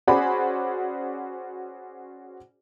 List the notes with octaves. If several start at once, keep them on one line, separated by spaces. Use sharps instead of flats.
C#4 F#4 G#4 C5 D5 B5